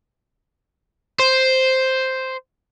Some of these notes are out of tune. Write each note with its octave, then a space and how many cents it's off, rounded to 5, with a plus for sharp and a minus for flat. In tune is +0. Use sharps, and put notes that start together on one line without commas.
C5 +0